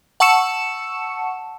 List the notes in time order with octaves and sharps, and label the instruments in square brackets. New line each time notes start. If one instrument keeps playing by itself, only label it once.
[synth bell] F#5 A5 C#6 E6 C#7 E7